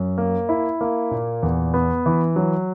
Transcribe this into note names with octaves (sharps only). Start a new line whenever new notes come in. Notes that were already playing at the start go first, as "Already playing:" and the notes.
Already playing: F#2
A#3
E4
A#3
A#2
E2
B3
E3
F#3